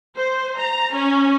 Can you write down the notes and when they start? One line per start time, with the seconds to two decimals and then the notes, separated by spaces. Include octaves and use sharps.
0.16 C5
0.57 A#5
0.93 C#4